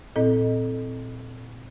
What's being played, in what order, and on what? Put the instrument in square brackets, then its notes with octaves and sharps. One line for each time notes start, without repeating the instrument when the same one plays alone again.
[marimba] A#2 C4 E4 A4 D#5